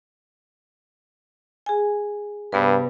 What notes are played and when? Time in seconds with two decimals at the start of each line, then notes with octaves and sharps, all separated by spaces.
1.66 G#4 G#5
2.52 G2 C3 B3 B4